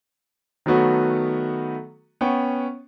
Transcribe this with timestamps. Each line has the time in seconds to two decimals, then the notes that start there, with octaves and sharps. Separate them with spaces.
0.66 D#3 F#3 A3 B3 F#4
2.21 B3 C#4 G5 C#6